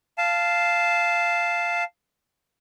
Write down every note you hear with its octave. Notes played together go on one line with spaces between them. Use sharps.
F5 A5